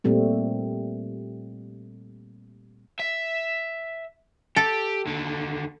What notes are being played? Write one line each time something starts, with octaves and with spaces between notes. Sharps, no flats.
A#2 G3 A3 C4
E5
G4 A4
D#2 D3